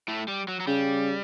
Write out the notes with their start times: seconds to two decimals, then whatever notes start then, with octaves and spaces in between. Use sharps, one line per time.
0.08 A2 A3
0.28 G3
0.48 F#3
0.60 F#3
0.67 C#3 G3